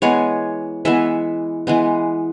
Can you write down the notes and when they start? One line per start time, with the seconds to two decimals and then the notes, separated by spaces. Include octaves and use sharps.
0.02 E3 G#3 B3 C#5
0.85 E3 G#3 B3 E5
1.67 E3 G#3 B3